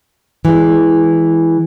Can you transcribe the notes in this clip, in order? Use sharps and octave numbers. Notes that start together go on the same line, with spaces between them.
E3 G#3